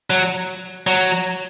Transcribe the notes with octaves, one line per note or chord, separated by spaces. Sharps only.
F#3
F#3